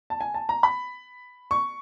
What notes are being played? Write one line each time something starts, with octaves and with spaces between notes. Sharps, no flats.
A5
G#5
A5
A#5
B5
C#6